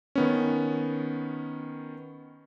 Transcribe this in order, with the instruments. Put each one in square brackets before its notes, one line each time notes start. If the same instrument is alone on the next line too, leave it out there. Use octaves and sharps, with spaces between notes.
[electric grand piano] D#3 B3 C#4